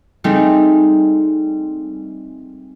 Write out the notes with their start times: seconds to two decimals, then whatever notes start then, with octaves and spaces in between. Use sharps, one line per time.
0.24 G3 A3 C4 D#4 G4 G#4